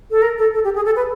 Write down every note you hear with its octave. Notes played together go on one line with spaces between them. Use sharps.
A4
A#4
A4
A4
G4
G#4
A4
B4